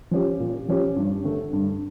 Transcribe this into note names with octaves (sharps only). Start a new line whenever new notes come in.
F3 C#4 G4
A#2
F3 C#4 G4
G2
D3 A3
G2